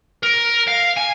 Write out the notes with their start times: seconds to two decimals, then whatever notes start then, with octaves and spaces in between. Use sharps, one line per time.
0.23 A#4
0.68 F5
0.97 G#5